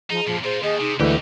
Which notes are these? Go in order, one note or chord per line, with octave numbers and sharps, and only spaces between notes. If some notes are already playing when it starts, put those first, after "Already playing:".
F3 D#4 G#4
F#2 A#2 F3
A#2 F4 G#4 C5
D#2 G#4 D#5
C3 D#4
D2 E3 G#3 D#4 G4 A4